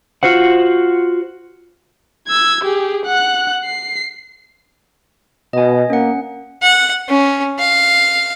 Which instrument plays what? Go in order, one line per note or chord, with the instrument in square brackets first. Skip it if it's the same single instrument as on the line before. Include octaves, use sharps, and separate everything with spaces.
[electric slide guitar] F4 F#4 C5 F#5
[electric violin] E6 G#6
G4 G#4
F#5 F#6
C7
[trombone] B2 [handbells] D#5 G#5
[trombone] A#3 [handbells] C#4 F#5
[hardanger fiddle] F#5
C#4
F5